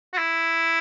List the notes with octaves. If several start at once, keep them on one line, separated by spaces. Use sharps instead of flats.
F#4
E4